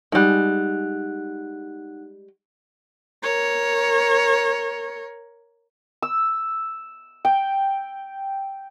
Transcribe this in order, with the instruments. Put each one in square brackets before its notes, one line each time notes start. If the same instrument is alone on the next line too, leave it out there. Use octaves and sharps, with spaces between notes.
[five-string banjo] G3 G#3 [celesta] D#4 F#5 F#6
[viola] A#4 C#5
[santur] E6
G5